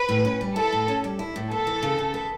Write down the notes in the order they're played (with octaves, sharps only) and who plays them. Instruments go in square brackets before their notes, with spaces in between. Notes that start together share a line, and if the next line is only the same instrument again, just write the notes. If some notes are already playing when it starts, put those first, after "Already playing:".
Already playing: [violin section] B4
[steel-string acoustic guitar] A2
C#4
G3
[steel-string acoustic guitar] E4 [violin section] A4
[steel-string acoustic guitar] A2
C#4
G3
E4
A2
[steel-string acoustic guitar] B3 [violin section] A4
[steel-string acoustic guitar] E3
C#3
C#3
B3